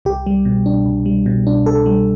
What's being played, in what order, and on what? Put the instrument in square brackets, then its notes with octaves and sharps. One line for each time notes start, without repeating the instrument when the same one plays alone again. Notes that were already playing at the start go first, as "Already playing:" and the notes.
[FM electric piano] C2 G4
G3
B2
D4
C2
G3
B2
D4
C2 A4
G3